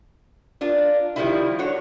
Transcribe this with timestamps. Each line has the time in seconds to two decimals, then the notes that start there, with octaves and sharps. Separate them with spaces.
0.61 D4 F4 A#4
1.16 D#3 F3 G3 G#3 A#3 E4
1.59 D4 F#4 A4 C#5